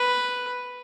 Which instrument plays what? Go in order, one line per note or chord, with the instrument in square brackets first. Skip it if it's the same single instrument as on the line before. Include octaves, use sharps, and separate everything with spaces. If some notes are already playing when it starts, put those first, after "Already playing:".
Already playing: [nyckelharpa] B4